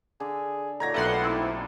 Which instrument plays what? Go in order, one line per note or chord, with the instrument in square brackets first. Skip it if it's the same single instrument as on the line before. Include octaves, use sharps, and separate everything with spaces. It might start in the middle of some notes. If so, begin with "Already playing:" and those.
[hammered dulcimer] D3 [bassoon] G#4
[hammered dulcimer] A#2 F#3 D#4 [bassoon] D3 [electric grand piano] A#5 G#6 A#6
[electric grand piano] B1 A4 [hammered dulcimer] G3 [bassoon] A3 [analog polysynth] B4 F#5 C6
[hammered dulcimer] A#3 [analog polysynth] C4 E4